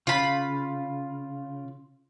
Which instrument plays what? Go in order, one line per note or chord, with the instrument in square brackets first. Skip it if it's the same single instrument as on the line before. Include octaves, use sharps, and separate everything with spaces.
[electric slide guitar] C#3 [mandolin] F4 B5